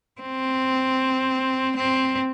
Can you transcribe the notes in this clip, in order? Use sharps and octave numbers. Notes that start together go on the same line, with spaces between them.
C4
C4